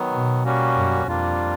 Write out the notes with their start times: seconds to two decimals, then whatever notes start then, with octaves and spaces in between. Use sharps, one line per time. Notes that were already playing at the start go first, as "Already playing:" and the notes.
Already playing: D#3 F#3 B3
0.11 B2
0.44 G3 A#3 C#4 F#4
0.76 F#2
1.07 F2 G3 A#3 D4 F4